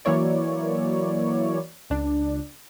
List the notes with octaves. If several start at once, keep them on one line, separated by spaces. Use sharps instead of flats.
E3 F#3 A#3 E4 C#5 D5
C#2 D4